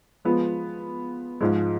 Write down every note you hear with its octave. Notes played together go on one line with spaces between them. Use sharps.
F3 G#3 B3 F4
G#2 F3 G#3